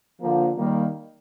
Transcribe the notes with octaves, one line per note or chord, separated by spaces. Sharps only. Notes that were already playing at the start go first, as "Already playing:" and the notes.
D3 F3 A#3
D#3 G3 A#3